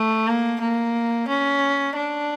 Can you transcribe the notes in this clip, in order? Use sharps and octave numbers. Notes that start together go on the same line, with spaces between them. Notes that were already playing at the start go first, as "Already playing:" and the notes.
Already playing: A3
A#3
A#3
C#4
D4